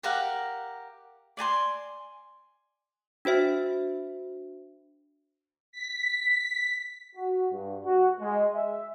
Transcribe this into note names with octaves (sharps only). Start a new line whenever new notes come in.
G4 A#4 F5 F#5
D5 G#5 A5 C6
D4 F#4 C5 E5
B6
F#4
G2
F#4
G#3
E5